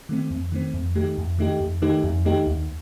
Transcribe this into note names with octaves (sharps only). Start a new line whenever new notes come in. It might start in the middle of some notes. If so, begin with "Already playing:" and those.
D#3 A3 C4
F2
D#3 A3 C4
F2
D#3 A3 D#4 G4
F2
D#3 A3 D#4 G4
F2
D#3 A3 D#4 G4
F2
D#3 A3 D#4 G4
D#2